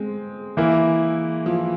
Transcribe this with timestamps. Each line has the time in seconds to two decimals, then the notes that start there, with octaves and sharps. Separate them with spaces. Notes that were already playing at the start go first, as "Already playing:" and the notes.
Already playing: G#3 C4
0.57 E3 A#3 E4
1.46 F3